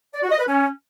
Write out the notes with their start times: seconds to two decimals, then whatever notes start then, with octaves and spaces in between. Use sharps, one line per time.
0.14 D5
0.23 F#4
0.31 D#5
0.39 B4
0.47 C#4